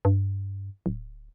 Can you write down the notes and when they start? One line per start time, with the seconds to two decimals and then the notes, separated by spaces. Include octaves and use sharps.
0.05 G2
0.86 D1